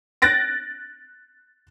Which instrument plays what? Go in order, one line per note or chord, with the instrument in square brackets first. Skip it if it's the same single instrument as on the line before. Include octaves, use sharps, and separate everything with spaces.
[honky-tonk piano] F#6 A6 A#6 D7